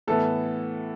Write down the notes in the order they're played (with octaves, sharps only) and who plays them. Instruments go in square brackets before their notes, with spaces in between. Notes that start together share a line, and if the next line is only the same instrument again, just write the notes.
[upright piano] A2 E3 B3 [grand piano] A4